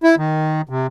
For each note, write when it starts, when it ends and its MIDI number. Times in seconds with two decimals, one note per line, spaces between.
0.03 0.15 64
0.17 0.61 51
0.69 0.87 48